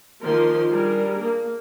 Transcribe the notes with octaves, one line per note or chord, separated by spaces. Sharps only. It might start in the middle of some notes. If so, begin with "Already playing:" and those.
D#3 F3 A#3 A#4 C6
G3 D4 G#4 A#4
A#3